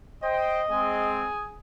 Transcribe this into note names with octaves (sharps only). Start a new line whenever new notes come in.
C5 D#5 G5
G#3 C4 G#4